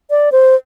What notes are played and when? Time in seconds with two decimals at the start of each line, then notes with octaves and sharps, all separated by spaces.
0.10 D5
0.32 C5